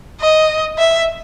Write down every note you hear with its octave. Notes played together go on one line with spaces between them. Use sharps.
D#5
E5